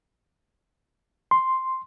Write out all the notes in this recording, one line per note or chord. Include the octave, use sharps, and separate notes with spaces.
C6